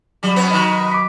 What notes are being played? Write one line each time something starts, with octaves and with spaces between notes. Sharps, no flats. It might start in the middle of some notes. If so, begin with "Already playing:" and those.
F#3 G3
F2 B3
B2 D#3 D#5
D6 B6